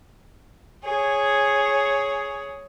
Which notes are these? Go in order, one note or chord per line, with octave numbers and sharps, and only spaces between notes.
G#4 C#5